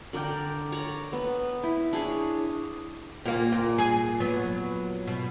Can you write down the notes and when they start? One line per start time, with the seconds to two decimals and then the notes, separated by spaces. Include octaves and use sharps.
0.13 D3 A#4 D5 G5
0.72 C#5 D5 A#5
1.13 B3
1.63 E4
1.93 D4 G#4 C#5
3.25 A#2 A#3
3.52 A#2
3.78 G#4
4.20 F#3 B3
5.07 B2